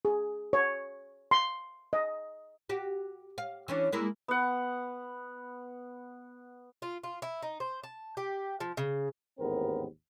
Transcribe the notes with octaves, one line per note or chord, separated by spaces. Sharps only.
G#4
C#5
C6
D#5
F#4 G4
F5
E3 C#4 D4
G#3 A#3 E4
B3 F#5
F4
F4
E4
D#4
C5
A5
G4
F3
C#3
A1 D#2 G#2 B3 C4 A#4